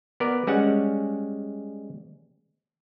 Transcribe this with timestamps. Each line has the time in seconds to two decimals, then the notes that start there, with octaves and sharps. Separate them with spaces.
0.20 B3 A#4 D5
0.47 G3 G#3 C#4 F#5